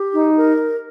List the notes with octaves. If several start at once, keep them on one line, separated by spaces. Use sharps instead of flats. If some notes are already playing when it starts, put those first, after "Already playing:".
Already playing: G4
D#4
A#4